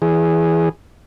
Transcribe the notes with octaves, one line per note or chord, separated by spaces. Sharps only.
E3 G#4